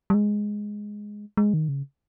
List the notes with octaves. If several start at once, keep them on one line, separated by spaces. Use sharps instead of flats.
G3
G#3
G#3
D#3
C#3